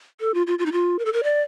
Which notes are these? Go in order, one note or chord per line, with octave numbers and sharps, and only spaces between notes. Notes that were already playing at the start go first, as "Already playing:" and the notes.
A4
F4
F4
F4
D#4
F4
A#4
A4
A#4
D5